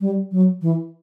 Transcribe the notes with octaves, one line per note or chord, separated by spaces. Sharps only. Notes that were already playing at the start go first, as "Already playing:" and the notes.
G3
F#3
E3